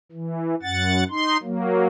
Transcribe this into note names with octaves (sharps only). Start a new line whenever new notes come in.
E3
F#2 F#5 A6
D#4 C6
F#3 A#3